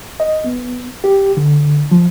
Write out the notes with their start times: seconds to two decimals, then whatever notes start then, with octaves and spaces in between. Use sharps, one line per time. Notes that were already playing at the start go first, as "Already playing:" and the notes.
0.20 D#5
0.44 B3
1.04 G4
1.37 D3
1.91 F3